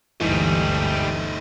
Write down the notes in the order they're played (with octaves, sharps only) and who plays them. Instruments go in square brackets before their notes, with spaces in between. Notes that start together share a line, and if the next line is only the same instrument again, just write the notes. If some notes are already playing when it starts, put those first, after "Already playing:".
[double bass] G1 D2 [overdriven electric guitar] G#2 G3 [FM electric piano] E3 [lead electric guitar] A3 D#4